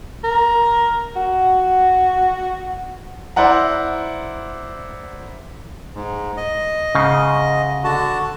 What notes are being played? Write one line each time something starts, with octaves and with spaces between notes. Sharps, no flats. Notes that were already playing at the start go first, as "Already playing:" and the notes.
A#4
F#4
E4 C5 D5 F#5 A#5
G#2
D#5
G#2 C#3
D3 F#4 A5